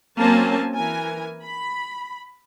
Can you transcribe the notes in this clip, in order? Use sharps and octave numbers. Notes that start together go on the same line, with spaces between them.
F#3 A#3 C4 C#4 G#5 A5
E3 A#4 G#5
B5